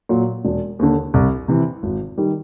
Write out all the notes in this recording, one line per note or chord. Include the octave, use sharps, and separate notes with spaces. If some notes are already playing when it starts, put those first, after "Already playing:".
A#2 F#3
E1
D#2 D3
C2
C3 E3
G#1
D#3 G3